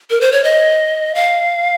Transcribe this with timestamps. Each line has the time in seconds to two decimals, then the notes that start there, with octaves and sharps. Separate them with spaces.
0.10 A#4
0.21 C5
0.32 C#5
0.44 D#5
1.15 F5